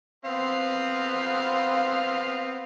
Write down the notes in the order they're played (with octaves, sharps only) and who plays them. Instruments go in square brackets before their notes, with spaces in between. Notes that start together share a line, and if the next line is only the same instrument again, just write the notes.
[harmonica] B3 C4 F5